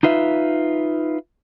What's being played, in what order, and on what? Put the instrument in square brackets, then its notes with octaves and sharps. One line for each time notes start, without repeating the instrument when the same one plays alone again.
[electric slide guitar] D#4 F4 B4 E5